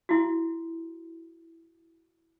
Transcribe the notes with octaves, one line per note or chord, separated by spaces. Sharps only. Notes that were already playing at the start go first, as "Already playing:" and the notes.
E4 F#4